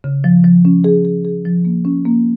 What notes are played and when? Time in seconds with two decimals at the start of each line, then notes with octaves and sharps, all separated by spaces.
0.04 C#3
0.24 F3
0.44 F3
0.65 C#4
0.84 G#4
1.05 G#4
1.25 G#4
1.45 F3
1.65 A#3
1.85 C#4
2.05 A#3